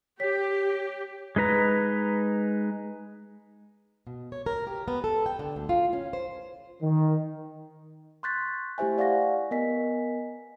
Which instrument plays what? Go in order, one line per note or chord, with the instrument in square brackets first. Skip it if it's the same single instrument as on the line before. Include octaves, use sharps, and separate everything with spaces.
[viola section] G4 [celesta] C#5 B6
[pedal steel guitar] G#3 D#4 B4 A#5
[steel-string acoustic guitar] B2
C#5
A#4
G4
B3
A4
G5
D3
D2
F4
C#4
C5
[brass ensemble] D#3
[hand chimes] C6 C#6 F#6 G6 A6 B6
A3 E4 G4 C5 E5 G#5
D5 F5 F#5 C#6 A#6
B3 A#4 D#5 G#5 B6